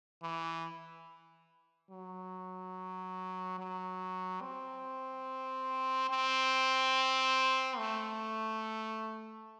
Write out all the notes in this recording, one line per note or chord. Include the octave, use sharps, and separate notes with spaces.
E3
F#3
F#3
C4
C4
A3